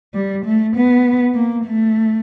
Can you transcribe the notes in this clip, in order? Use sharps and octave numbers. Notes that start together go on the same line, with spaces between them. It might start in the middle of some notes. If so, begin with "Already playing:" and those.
G3
A3
B3
A#3
A3